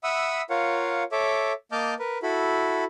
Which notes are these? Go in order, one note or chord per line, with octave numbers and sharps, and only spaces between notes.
E5 F#5 B5 D#6 E6
F4 A#4 C#5 F5 F#5
A4 C#5 E5 D6
A#3 D#5 A5 D6 F6 G6
A#4 B4
E4 F#4 A4 B5